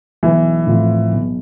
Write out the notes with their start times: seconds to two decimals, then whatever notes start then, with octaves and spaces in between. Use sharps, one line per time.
0.23 B1 E3
0.67 A2 F3 C4 F4
1.12 B1